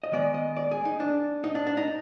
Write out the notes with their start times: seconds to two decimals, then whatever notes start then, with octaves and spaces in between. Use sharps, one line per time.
0.04 D#5
0.12 D#3 G#3 B3 D5
0.34 D#5
0.56 D5
0.71 G#4
0.85 D#4
1.00 D4
1.44 D#4
1.55 D4
1.67 D4
1.77 D#4